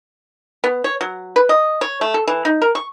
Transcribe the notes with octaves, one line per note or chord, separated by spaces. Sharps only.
B3
C#5
F#3
B4
D#5
C#5
A3
A4
E3
D#4
A#4
C#6